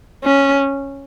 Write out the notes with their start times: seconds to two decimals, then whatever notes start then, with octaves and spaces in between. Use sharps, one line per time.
0.24 C#4